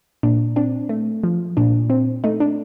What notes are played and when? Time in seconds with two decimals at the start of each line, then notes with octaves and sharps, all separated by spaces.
0.23 A#2 D4
0.56 C4 D4
0.89 A3
1.24 F3
1.57 A#2 D4
1.90 C4
2.24 A3 D#4
2.40 D4